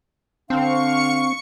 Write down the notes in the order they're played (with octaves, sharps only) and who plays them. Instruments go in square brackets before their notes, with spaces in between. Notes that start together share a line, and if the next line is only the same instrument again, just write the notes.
[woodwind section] D3 D4 F5 [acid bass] C4 [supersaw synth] C#6 C#7